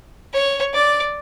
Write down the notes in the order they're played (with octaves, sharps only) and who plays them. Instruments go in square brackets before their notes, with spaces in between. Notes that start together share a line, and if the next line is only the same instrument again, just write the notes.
[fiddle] C#5
D5